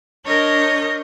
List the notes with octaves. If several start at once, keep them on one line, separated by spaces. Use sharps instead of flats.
D4 A#4 C#5 D#5 G6